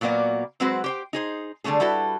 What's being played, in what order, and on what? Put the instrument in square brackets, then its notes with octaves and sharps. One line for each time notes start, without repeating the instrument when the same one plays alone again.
[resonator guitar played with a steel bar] A#2 F#3 A#3 B3 D5
F#3 G#3 C4 F#4 B4 C5
G4 C5 G5
D#4 G#4 C5
D3 G3 A3 B3 G#4
G3 E4 F#4 A4 B4